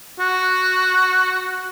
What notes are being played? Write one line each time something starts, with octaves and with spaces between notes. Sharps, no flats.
F#4